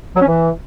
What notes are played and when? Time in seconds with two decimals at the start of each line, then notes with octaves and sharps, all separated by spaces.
0.16 F#3
0.22 C#4
0.27 E3